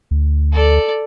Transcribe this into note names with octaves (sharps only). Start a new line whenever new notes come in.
D2
A4 D5